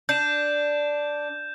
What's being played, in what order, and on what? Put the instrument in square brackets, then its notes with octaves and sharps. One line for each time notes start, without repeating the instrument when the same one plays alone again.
[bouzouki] D4 [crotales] G6 E7